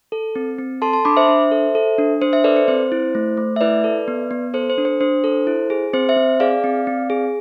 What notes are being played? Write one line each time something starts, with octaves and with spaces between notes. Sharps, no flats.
A4
C4
C4
A4 A5 C6
A5 C6
D4 B5 D6
C5 E5
D4
A4
A4
D4
D4 C5
C5 E5
A4 B4 D5
C5
C4 C5
E4
A3
A3
E5
E4 B4 D5
A4
B3
B3
A4 C5
C5
D4
C5
D4 C5
A4
E4
G#4
C4 C5
C5 E5
C4
G#4 D5 F5
C4
C4
G#4